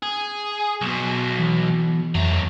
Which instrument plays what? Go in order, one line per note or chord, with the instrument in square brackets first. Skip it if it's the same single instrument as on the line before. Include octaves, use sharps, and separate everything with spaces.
[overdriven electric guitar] G#4
B1 B2
[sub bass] E3
[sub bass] F2 [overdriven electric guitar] F#3 A3